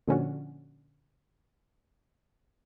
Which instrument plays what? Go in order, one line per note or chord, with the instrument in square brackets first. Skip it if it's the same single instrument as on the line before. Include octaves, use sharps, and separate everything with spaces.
[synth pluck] A#2 D3 F3 C#4 D4 F#4